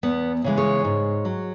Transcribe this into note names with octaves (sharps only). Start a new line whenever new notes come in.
E2 B3
C#3 E3 G#3
G#4 C#5
G#2
F#3